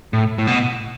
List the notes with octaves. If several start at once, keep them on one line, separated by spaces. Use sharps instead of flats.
A2
A2
B2